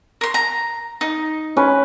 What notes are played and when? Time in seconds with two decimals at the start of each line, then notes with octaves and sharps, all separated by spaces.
0.21 A#4 C6
0.34 A#5
1.01 D#4
1.56 C#4 B4